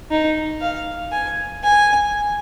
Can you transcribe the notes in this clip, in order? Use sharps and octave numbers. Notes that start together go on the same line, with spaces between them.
D#4
F5
G#5
G#5